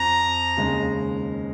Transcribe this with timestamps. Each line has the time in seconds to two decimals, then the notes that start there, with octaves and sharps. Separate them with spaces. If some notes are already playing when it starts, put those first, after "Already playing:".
Already playing: F2 A#5
0.57 D#2 C#3 G#3 D#4